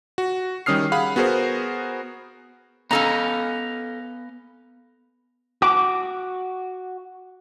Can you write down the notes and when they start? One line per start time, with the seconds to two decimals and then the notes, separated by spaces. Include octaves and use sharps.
0.18 F#4
0.66 D#3 G3 C#4 D#6 F6 C7
0.92 G#4 F5 F#5 B5
1.16 B3 F#4 G#4 A#4 C5
2.91 B3 C#4 A4 D#5 F5 A#5
5.62 F#4 D6